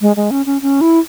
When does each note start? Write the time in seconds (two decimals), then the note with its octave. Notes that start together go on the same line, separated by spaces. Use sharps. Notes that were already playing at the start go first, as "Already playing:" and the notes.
0.01 G#3
0.17 G#3
0.31 C#4
0.46 C#4
0.62 C#4
0.81 E4